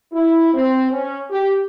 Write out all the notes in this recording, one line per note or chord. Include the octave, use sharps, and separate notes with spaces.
E4
C4
C#4
G4